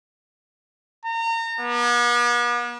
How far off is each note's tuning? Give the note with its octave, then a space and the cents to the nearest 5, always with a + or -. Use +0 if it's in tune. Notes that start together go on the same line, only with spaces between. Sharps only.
A#5 -30
B3 -45